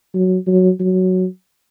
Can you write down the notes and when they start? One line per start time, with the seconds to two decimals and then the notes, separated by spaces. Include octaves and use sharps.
0.14 F#3
0.47 F#3
0.80 F#3